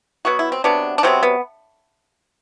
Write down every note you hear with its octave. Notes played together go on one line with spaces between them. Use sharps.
B2 F#3 B3 F#4
E4
C4
C3 F#3 B3 D4
D4
C3 F#3 B3 C4
B3